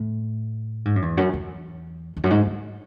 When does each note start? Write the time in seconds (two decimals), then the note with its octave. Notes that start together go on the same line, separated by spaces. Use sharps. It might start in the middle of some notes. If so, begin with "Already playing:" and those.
Already playing: A2
0.85 G#2
0.96 F#2
1.02 E2
1.17 F#2
1.33 E2
2.17 E2
2.24 F#2
2.30 G#2
2.47 G#2